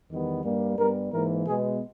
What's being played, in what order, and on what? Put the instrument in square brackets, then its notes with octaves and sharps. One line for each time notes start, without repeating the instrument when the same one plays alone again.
[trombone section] E2 D#3 G3 B3
G2 G3 A#3
G2 G3 B3 A#4
G#2 E3 A#3 A#4
B2 G#3 B3 G#4